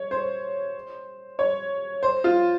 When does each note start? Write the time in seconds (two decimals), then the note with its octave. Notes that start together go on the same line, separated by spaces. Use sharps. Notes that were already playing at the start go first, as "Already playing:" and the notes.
Already playing: C#5
0.11 C5
1.39 C#5
2.03 C5
2.24 F4